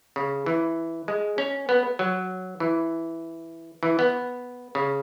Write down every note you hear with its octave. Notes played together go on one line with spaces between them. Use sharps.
C#3
E3
G#3
C#4
B3
F#3
E3
E3
B3
C#3